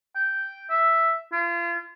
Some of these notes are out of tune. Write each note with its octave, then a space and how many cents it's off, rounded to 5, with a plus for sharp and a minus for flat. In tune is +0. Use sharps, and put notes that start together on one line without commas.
G5 -5
E5 +0
F4 -35